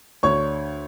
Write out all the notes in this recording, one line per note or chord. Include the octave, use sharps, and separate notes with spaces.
D2 D3 C#5 C#6